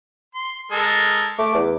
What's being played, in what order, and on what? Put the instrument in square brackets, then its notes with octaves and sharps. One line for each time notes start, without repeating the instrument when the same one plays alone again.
[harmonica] C6
G#3 A4 A#4
[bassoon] A3 [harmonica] D6
[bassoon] E2